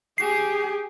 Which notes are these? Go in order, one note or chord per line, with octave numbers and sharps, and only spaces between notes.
G4 G#4 C7